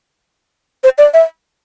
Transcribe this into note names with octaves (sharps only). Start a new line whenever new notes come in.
C5
D5
E5